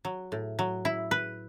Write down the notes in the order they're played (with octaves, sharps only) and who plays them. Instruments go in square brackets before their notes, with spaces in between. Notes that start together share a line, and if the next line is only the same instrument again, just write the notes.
[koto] F#3
A2
F#3
E4
B4